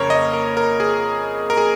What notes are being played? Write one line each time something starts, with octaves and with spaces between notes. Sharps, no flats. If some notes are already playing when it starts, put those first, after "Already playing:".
Already playing: F2 C#3 A#3 A#4 C#5
D#5
A#4
A#4
G#4
A#4
G#4